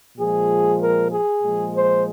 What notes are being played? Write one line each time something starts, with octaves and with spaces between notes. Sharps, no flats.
A#2 F3 G#3 G#4
A#4
G#4
A#2 F3 G#3
C5